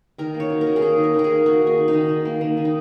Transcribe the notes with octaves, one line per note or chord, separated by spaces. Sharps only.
D#3 A#4
A#3
C#5
F#3
A#4
D#3
G#4
A#3 A#4
D#3
A#4
D#3 A#4
G#4
A#3
A#3 F#4
D#3
G#4
D#3
D#4
D#3
D#3
A#3
D#3
D#3
D#4